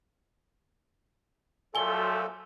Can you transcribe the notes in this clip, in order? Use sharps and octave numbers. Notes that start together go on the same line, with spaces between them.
A#2 F3 F#3 A3 A4 G#5 G7